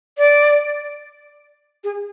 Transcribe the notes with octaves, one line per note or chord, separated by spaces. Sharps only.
D5
G#4